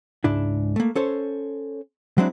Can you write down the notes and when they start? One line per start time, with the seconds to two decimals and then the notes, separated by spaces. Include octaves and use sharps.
0.24 C#2 G#2 D4 E4
0.76 A3 A#3
0.96 C#4 A4 C5 C#5
2.18 F#3 G#3 C4 D4 E4